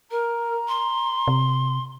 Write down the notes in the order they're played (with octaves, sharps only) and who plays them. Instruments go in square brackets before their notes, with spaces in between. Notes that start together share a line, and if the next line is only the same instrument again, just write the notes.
[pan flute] A#4 [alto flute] A#5
[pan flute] C6
[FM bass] C3